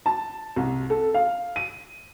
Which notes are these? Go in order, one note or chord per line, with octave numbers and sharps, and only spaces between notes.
A5
C2
A4
F5
D#7